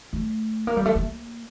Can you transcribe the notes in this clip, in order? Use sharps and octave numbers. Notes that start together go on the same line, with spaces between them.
A3
A#3
G3
A3
A#3